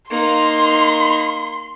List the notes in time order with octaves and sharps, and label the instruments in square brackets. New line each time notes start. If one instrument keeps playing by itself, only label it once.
[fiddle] A#3 D#4 [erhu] C6